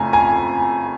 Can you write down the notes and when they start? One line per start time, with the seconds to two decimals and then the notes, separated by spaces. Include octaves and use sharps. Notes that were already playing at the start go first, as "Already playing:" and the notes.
Already playing: F2 C#3 A3 G#5 A#5
0.13 G#5 A#5